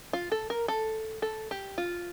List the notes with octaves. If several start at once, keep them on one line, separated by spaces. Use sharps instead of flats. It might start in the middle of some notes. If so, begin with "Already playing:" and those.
F4
A4
A#4
A4
A4
G4
F4